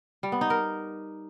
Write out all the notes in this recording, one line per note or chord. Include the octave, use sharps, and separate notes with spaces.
G3
B3
D#4
A#4